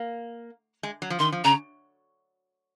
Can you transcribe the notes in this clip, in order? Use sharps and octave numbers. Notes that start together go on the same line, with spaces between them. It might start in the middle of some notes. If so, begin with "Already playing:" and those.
Already playing: A#3
G#3
F#3
F3
D#3 C6
F3
C#3 A#5